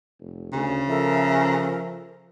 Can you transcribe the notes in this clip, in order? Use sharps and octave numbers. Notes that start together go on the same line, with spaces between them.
F1
D2 C#3
F3 A4 A#4 E5